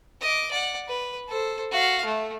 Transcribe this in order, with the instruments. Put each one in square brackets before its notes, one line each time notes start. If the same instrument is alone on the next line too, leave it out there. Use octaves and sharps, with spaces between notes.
[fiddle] D#5 D6
D5 F#5
B4
A4 C5
F#4 F5
A3